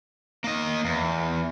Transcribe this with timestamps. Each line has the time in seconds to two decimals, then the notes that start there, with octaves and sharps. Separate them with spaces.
0.44 A#3 D#5
0.85 E2